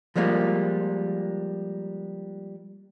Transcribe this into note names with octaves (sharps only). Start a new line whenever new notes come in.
F3 G3 G#3 A#3 F4